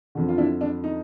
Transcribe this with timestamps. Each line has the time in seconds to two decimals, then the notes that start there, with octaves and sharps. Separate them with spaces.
0.15 F2 D3
0.28 F4
0.38 D4 E4
0.61 D4
0.84 D#4